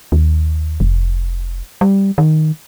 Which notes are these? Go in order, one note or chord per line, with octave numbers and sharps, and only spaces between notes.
D#2
F1
G3
D#3